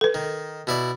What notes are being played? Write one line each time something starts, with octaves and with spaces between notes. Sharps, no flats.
A4 B4
D#3
B2 E4 D5